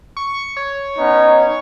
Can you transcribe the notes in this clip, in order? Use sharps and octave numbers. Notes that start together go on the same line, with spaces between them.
C#6
C#5
B3 C#4 D#4